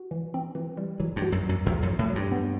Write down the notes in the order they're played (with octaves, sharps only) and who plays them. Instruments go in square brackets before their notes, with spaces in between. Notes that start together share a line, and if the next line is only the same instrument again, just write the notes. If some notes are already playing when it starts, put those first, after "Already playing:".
Already playing: [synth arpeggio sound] F#4
E3
C4
E3
G3
[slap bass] E3 [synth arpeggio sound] F#3
[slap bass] G2
[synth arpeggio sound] F#4
[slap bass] F#2
[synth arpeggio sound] F#3
[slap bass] F#2
[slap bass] E2 [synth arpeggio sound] F#3
[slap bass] F#2
[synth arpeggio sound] F#3
[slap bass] A2
[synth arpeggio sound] F#3
[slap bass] G2
[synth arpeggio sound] B3